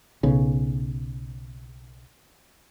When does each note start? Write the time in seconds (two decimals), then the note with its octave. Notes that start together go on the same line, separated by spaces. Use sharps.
0.23 B1 C#3